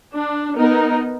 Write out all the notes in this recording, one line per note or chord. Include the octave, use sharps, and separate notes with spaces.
D4
B3 D#4 A#4